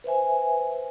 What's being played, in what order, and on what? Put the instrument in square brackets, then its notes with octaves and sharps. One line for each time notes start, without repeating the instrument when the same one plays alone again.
[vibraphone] B4 C5 E5 G#5